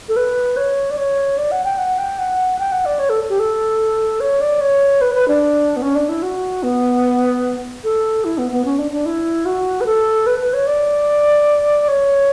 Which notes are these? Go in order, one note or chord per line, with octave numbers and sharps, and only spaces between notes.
A4
B4
C#5
D5
C#5
D5
F#5
G5
F#5
G5
F#5
G5
F#5
D5
C#5
A4
G4
A4
C#5
D5
C#5
B4
B4
D4
B3
C#4
D4
E4
F#4
B3
A4
E4
B3
B3
C#4
D4
D4
E4
F#4
B4
A4
B4
B4
C#5
D5
C#5